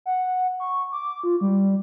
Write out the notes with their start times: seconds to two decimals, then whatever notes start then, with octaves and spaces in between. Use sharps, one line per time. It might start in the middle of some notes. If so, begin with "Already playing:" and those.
0.06 F#5
0.60 C#6
0.92 D6
1.23 F4
1.41 G3